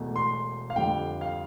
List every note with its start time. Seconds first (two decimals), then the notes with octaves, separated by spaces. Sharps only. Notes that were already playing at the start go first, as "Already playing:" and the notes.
Already playing: E1 E2 B2 A3
0.16 C6
0.70 F5
0.76 F2 D3 G3 G5
1.21 F5